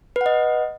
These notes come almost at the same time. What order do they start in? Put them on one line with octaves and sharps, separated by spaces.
B4 F#5 D#5